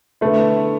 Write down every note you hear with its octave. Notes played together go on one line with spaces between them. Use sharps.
D3 A3 B3 E4